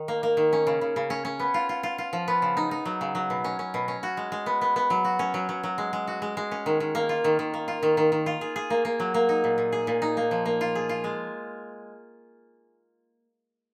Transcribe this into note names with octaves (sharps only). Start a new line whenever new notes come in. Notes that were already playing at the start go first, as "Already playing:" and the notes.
Already playing: D#3
A#3
A#3
D#3
C#4
C#3
C#3
C#3
C#4
C#4
B3
F4
F4
F4
F4
F3
B3
C#3
D#4
D#4
F#3
C#3
F#3
B2
C#4
C#4
B2
C#4
F#4
G#3
G#3
B3
B3
B3
F#3
F#4
C#4
F#3
F#3
F#3
G#3
G#3
F#4
G#3
G#3
C#4
D#3
D#3
A#3
F4
D#3
D#3
A#3
F4
D#3
D#3
D#3
F4
G#4
G#4
A#3
A#3
F#3
A#3
D#4
A#2
A#2
G#4
A#2
D#4
A#3
F3
A#3
F4
G#4
F4
G#3